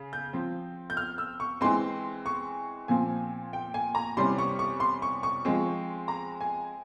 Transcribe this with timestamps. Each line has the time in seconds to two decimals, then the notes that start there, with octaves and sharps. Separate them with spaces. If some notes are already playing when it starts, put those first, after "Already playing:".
Already playing: C#3
0.13 G6
0.33 F3 C4
0.90 G6
0.97 F6
1.18 E6
1.40 C#6
1.61 E3 G#3 C4 C6
2.26 C#6
2.88 A#2 F3 C4 G#5
3.53 G5
3.74 G#5
3.95 A#5
4.17 C3 E3 G3 C#4 C6
4.38 C#6
4.59 C#6
4.80 C6
5.02 C#6
5.23 C#6
5.45 F3 G#3 C4
6.08 A#5
6.41 G#5